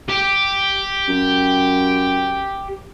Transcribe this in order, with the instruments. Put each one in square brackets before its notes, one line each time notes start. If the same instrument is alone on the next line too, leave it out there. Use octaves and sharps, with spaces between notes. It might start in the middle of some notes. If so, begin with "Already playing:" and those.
[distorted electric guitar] G4
[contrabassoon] F#2